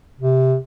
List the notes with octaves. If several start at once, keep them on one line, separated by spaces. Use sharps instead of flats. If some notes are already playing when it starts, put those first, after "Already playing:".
C3